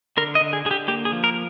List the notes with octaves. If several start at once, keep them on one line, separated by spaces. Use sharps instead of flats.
D3 A#4
D#5
D3
G#4
D3 G#4
G4
A#3 G4
G#4
F3
A#4